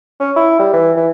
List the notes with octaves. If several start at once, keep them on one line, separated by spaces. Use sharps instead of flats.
C#4
E4
G3
E3
E3